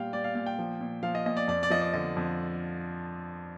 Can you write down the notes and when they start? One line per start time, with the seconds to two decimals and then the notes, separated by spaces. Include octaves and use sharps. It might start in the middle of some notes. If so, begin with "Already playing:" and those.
Already playing: A#2 G3 F5 G5
0.13 G3 D5
0.24 F5
0.35 A#2 F5
0.46 G5
0.59 F3
0.81 A#2
1.03 F3 F5
1.15 D#5
1.26 A#2 D#5
1.37 D5
1.48 F2 D5
1.63 D5
1.70 F3 D#5
1.82 D5
1.94 D3 D#5
2.17 F2